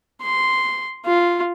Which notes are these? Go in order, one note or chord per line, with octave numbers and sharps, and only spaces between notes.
C6
F4